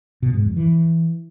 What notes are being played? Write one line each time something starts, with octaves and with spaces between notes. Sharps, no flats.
B2
G#2
F2
E3